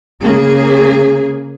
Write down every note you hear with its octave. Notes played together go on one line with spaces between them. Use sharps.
C#3 A#3 G#4